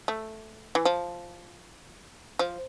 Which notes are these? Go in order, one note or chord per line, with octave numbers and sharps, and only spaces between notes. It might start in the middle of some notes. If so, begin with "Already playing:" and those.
A3
E3
F3
F3